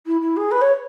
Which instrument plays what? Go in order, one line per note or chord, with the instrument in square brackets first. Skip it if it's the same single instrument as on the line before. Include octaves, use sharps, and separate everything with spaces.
[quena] E4
E4
G#4
B4
C#5